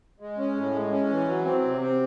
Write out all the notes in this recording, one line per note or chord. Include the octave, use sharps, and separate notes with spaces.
G#3
C#4
A2
G#3
C#4
E3
F#3
C4
C3
C4